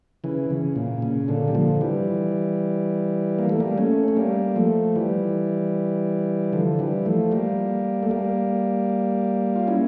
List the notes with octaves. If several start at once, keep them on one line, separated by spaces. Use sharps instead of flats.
C#3 E3
C#3
A#2
C#3
A#2 D3
G3
D3 F3
E3 G3
A#3
A3
G3 A#3
A3 C#4
C#4
G3 A#3
F3 A3
E3 G3
D3 F3
E3 G3
F3 A3
G3 A#3
A3
G3 A#3
F4
C#4 E4